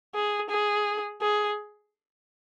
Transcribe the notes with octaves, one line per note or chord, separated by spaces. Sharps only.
G#4
G#4
G#4